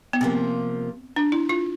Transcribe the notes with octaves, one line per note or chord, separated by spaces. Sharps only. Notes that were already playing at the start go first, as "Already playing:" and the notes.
B3
C3 F3 A#3 C4
D4
E4
F4